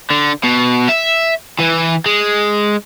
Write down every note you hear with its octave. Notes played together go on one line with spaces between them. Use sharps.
D3
B2
E5
E3
G#3